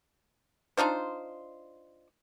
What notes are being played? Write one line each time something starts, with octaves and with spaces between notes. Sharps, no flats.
D4 D#4 F4 C5